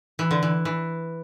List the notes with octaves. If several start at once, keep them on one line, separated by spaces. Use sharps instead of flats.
E3
D3
E3
E3